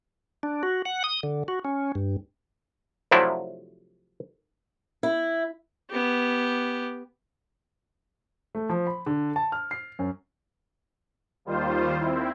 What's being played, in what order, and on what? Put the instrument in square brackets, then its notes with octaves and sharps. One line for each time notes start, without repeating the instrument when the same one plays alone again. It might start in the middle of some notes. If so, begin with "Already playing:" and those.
[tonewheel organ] D4
F#4
F#5
D#6
D3
F#4
C#4
G2
[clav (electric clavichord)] C3 F3 F#3 A3 D4 E4
[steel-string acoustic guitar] E4
[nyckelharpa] B3 G4
[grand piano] A3
F3
B5
D3
A5
F6
C7
F#2
[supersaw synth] D#2 D#3 G3 F4 C5
C4 E4